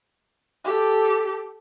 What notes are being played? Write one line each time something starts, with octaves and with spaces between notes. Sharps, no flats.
G4 A4